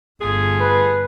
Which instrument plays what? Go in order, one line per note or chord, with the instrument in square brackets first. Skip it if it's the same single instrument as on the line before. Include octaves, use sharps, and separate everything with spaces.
[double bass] G1 [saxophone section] A3 F4 G#4
[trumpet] B4